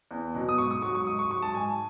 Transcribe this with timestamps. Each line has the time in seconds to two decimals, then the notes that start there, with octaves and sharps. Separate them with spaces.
0.11 E2
0.34 B2 F#3
0.49 D#6
0.58 G#2 C#6
0.71 D#6
0.82 F#3 C#6
0.95 C#6
1.06 G#2 D#6
1.19 C#6
1.30 F#3 C#6
1.42 A5
1.55 G#2 G#5